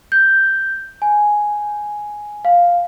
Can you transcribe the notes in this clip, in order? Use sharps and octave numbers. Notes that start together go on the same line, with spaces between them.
G6
G#5
F5